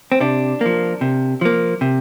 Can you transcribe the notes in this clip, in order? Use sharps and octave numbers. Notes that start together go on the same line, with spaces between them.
C4
C3 D4
F3 A#3
C3
F3 A#3
C3